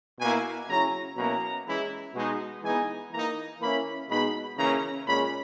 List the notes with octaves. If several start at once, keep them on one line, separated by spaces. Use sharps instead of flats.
B2 A#3 E4 G#5
C#3 F#3 C#4 E4 A#5
B2 F#3 A#3 C#4 E4 A#5
E3 G#3 C#4 E4
B2 G#3 D#4
E3 G#3 B3 D#4 G#5
E3 A#3 D#4 A#5
E3 A#3 C#4 E4 B5
B2 G#3 B3 D#4 B5
C#3 E3 A#3 C#4 E4 A#5
A#2 G#3 C#4 B5